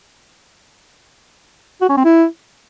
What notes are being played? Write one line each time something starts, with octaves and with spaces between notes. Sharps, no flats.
F#4
C#4
C4
E4